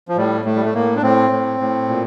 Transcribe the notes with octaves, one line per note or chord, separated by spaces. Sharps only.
F3
A2 G3
A2 A3
G3
A3
A2 A#3
D4
A2 C4
A2
A2
A#2